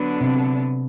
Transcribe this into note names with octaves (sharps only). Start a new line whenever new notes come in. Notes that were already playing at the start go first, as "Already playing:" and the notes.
Already playing: D3 F#3 B3 D4
C3